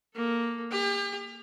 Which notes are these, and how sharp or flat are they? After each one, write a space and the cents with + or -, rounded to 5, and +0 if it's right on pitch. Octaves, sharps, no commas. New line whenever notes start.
A#3 +0 A4 +0
G4 +40 G5 +45